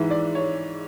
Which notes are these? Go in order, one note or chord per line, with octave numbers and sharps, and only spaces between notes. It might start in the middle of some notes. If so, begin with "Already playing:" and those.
Already playing: G#2 E3 G#3 E5
D5
C#5